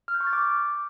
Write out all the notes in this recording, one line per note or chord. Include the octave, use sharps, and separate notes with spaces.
F6
G6
C#6
A6
D6